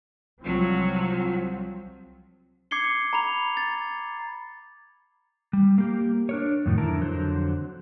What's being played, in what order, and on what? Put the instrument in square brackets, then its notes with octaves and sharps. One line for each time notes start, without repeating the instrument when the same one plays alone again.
[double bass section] C2 F3 C4 [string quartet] F#3
[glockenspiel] D6 G#6 C7 C#7 G7
C#7
A#5 B5 F7
A6
[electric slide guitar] G3
A#3 G4
D4 A#4 C#5
F2 A2 D#3 F3
F2 D3 E4 A#4 A5
F2 D3 F#3 C5